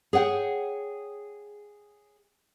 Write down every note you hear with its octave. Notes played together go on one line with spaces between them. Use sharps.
G#4 C#5 F#5 G5